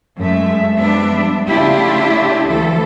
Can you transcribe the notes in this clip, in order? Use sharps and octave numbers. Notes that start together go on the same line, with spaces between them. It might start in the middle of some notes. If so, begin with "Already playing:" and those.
F#2 G#3 A3 E5
F3 G3 G#3 B3 D4 E5
C#3 A3 D4 E4 F4 G4
D2 E3 F3 A4